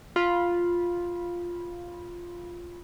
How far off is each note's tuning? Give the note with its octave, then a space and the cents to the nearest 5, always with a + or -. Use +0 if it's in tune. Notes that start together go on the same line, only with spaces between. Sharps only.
F4 +0 B5 -15